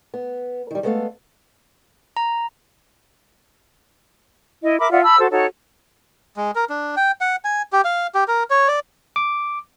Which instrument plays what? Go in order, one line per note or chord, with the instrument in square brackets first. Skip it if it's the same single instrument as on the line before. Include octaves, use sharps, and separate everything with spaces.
[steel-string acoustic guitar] B3
D#3 G3
G#3 A3 B3 A4 E5 F5
[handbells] A#5
[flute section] E4 D#5
A#4 E5 B5 D6
F4 D5 E5 F#5
A5 B5 E6
F#4 A4 C5
D#4 F#4 A4 C#5
[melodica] G#3
A#4
D4
G5
F#5
G#5
G4
F5
G4
A#4
C#5
D5
[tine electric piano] D6